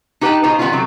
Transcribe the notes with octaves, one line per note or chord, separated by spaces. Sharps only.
D#4 G4 B4 F#5 G5 A5
B2 D#4 F4 G#4 C5 A#5
D#3 G3 B3 C#4 E4 F4
C3 F#3 A3